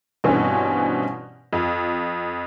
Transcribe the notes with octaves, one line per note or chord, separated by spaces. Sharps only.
G2 B2 E3 C4 C#4
F2